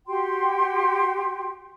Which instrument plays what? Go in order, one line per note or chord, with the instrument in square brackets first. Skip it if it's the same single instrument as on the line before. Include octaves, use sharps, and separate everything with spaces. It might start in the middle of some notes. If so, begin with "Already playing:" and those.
[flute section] F#4 G4 G5 C6